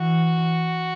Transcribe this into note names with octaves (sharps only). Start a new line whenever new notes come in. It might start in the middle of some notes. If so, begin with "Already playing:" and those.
Already playing: E3 F#4